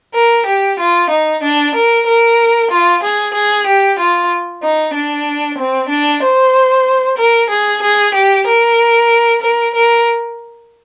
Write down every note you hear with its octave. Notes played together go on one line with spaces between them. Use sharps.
A#4
G4
F4
D#4
D4
A#4
A#4
F4
G#4
G#4
G4
F4
D#4
D4
C4
D4
C5
A#4
G#4
G#4
G4
A#4
A#4
A#4